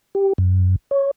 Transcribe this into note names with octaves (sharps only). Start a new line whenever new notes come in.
G4
F#2
C#5